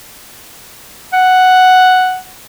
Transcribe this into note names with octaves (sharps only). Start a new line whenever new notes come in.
F#5